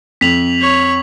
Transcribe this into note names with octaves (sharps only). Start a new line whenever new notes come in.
F2 B6 F7 F#7
C#5